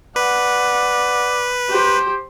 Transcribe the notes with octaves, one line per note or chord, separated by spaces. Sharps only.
B4 D5 F#5
G4 C5